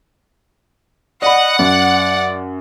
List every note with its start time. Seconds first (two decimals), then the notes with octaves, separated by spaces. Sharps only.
1.22 D5 D#5 F#5 B5
1.59 F#2 D5